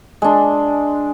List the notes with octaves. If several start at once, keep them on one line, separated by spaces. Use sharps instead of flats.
G#3 D4